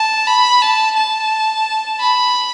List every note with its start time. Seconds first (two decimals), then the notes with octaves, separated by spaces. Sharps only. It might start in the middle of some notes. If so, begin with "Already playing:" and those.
Already playing: A5
0.27 B5
0.62 A5
0.96 A5
2.00 B5